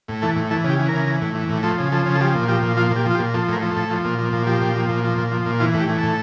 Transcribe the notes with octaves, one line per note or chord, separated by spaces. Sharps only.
A2
E3 A4
A2
E3 A4
C#3
G4
E3
A#4
C#3
E3
A2
E3
A2
F3 A4
C#3
F3 A4
C#3
A4
F3 G4
A#2
F3 G4
A#2
F3 F4
A#2
G4
F3 F4
G4
A#2
F3 A4
A2 A#4
F3
A4
A2
F3
A#2
F3
A#2
F3 G4
A#2
F3
A#2
F3
A#2
F3
A#2
E3 F4
A2
G4
E3
A2 A4